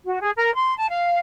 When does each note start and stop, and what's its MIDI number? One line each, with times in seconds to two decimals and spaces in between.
0.05 0.17 66
0.20 0.30 68
0.36 0.53 70
0.53 0.73 84
0.76 0.85 81
0.89 1.18 77